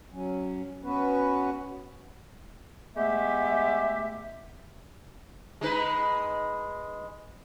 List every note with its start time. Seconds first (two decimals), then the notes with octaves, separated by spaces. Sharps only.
0.12 F#3 C#4
0.83 B3 C#4 F#4 B4
2.96 G#3 A3 B3 G4 E5
5.61 G#3 D#4 B4